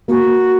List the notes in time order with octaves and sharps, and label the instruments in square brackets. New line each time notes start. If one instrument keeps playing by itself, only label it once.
[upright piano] A#3 [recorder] F#4